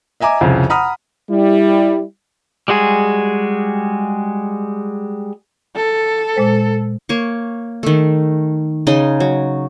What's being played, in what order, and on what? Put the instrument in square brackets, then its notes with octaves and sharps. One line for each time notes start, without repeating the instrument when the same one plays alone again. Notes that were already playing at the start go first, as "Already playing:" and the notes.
[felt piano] D#5 E5 G#5 A#5 D6
C2 F2 C#3
F#5 A#5 B5 D#6 F6
[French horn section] G3 E4
[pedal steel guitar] G3 G#3 F#4 G#4
[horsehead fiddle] A4
[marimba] A#2 G#3 C5
[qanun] A#3 C#5 C#6
D#3 A3
C#3 D#4 G#4 C6
F#3